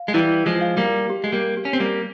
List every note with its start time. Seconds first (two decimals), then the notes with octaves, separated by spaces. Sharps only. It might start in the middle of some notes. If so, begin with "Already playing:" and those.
Already playing: F5
0.08 G#3
0.14 E3 G3 E4
0.46 F3 G#3
0.61 F5
0.77 G3 A#3
1.10 G4
1.24 G#3
1.32 G3 A#3
1.57 G4
1.65 C#4
1.73 C4
1.80 G3 A#3